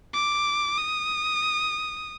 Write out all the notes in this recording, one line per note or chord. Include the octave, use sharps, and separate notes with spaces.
D6
D#6